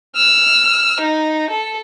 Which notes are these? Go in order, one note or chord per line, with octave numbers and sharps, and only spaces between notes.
E6 F6
D#4
A4